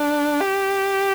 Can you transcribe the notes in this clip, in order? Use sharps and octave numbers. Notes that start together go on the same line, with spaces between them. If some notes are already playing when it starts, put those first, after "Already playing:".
Already playing: D4
G4